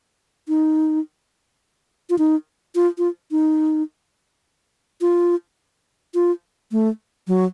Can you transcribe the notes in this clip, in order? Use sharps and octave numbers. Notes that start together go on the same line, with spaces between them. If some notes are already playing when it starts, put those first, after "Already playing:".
D#4
F4
D#4
F4
F4
D#4
F4
F4
A3
F#3